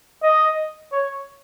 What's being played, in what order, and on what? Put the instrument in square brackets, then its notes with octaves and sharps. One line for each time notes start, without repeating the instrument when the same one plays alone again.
[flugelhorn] D#5
C#5